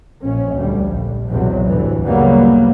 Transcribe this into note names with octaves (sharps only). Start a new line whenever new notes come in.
A#1 C#4
D2 G3
A#1
B1 E2 C3 F#3
G1 D2 A2 E3
A#2 C#3 F#3 G3 A#3 B3